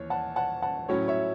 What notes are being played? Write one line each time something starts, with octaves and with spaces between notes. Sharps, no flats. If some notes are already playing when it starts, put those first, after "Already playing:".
Already playing: D#2 E3 C#5
F#5 A5
F#5 A5
F#5 A5
A2 F#3 C#4 E4 C#5
C#5 E5